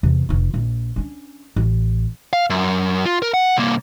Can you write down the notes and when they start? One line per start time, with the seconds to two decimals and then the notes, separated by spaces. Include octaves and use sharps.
0.03 E2 C3
0.29 F1 F4
0.54 A#1
0.96 C#4 D4
1.56 A1
2.33 F5
2.50 F#2
3.06 F4
3.22 A#4
3.34 F#5
3.57 C2 A#3